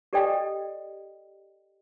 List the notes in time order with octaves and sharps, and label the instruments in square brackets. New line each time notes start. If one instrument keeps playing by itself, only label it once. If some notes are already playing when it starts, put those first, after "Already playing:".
[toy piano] G4 A4 D5 D#5 G5